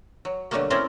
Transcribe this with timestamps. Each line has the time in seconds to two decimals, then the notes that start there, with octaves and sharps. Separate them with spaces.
0.25 F#3
0.51 B2 D3 F#3 G3 A3 A#3
0.70 C4 C#4 E4 A#4 C5 D5